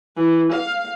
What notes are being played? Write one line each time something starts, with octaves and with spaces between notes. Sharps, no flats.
E3
F5